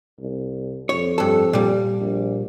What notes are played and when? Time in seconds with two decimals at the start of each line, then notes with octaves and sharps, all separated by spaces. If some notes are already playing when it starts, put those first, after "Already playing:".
0.20 C2
0.89 F2 C#5
1.18 G2 A4
1.53 A#2 G3
2.00 A#1